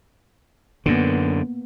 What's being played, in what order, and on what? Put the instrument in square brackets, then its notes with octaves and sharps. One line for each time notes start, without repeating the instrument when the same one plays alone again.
[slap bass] F#2 D3 [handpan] A#3 B3